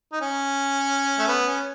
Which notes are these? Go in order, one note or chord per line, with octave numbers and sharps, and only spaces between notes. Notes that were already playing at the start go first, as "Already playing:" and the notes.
D#4
C#4
A3
B3
C#4